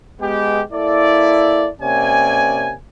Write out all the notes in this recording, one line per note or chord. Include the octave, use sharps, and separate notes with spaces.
G#3 B3 G4
A#3 E4 A4 D5
C3 A#3 C#4 D5 G#5